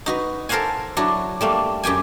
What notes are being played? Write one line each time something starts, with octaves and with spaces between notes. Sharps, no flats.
D#4 F#4 B4
A4 A#4 C5 F5 F#5 G#5
F#3 D4 E4 F#4
G3 A3 A#3
F#2 G4 G5 G#5